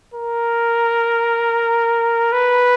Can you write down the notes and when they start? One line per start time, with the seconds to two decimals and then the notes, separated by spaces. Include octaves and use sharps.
0.14 A#4
2.32 B4